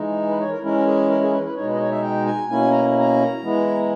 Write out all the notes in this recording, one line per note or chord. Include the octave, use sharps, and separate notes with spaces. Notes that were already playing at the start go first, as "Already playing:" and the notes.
Already playing: E3 G#3 D#4
B4
C#5
A#4
E3 G#3 C#4 E4 A#4
G#4
A#4
G#4
B4
B4
B2 G#3 D#4 C#5
B4
D#5
C#5
E5
G5
G#5
B2 A#3 C#4 E4 G#5
A#5
A#5
E3 G#3 B3 E4